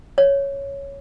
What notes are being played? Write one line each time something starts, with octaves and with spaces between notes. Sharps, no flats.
C#5